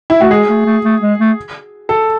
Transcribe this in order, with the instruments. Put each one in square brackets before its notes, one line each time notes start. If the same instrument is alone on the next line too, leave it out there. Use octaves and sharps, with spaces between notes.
[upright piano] E4
[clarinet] A3 [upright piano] F#4
[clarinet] G#3 [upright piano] G#4
[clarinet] A3
A3
A3
G#3
A3
[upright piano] A4